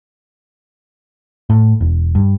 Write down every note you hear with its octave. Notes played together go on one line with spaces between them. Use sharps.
A2
E1
G2